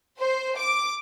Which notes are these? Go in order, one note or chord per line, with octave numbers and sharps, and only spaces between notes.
C5
D6